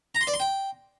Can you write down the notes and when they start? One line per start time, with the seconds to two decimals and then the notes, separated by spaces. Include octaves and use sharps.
0.15 A#5
0.21 C6
0.27 D5
0.34 C6
0.40 G5